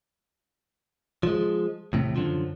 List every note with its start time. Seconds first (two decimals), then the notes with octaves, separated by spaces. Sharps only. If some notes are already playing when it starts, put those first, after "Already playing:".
1.23 F3 G#3
1.93 D#2 A2 C3
2.16 F#2 D3 F3